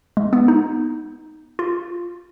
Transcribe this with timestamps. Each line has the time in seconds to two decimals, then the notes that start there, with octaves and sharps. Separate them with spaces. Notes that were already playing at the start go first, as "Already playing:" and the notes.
0.17 G#3
0.33 B3
0.48 D#4
1.59 F4